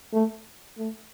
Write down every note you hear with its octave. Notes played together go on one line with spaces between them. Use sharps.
A3
A3